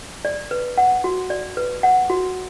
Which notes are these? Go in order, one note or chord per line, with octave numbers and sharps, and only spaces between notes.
D5
B4
F#5
F#4
D5
B4
F#5
F#4